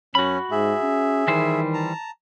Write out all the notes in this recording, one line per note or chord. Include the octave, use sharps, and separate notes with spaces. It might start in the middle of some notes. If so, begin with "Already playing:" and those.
F#2 C#4 F#4 B5
G#2 G#4 E5
C#4
D#3 E3 G3 C5
A5 A#5